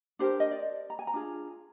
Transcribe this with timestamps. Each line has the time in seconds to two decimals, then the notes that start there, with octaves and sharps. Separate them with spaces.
0.19 D4 G4 A#4 C5
0.40 D#5
0.51 D5
0.90 A#5
0.99 G#5
1.07 A#5
1.14 D4 F4 G#4